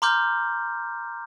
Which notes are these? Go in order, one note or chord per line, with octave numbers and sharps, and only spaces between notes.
A#5 C6 D6 F6 G6